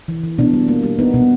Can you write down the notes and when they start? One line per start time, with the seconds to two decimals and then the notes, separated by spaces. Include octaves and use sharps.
0.08 E3
0.24 E3
0.38 B2 D4
0.53 G3
0.68 A#3
0.84 G3
0.99 B3 D#4
1.14 B2